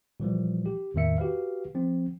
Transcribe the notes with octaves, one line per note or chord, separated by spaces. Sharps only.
A#2 E3 F3 G3
G4
E2 A2 D#3 A#3 E5 C#7
F#4 G4 B4 F5
F3 C4